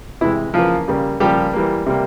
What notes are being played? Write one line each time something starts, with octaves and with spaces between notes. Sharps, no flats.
C3 E3 G#3 E4
C#3 E3 F3 A#3 F4
C#3 G3 A#3
C#3 F3 G3 A#3 G4
E3 G3 A#3
C3 G3 A#3